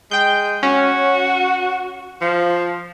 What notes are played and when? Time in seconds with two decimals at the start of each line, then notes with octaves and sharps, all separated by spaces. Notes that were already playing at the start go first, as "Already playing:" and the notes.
0.11 G#3 G5 G6
0.63 C#4 F#4
2.21 F3